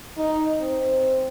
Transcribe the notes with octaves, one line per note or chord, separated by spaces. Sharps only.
D#4
C4